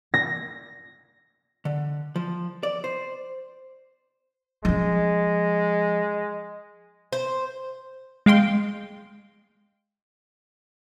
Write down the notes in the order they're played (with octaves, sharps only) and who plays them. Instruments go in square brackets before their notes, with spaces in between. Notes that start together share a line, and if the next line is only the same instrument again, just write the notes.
[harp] A#6
[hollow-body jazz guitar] D3
F3
D5
C5
[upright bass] F3 C#4 [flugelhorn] G#3
[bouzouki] C5
[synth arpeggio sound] G#3 F5 G5 C6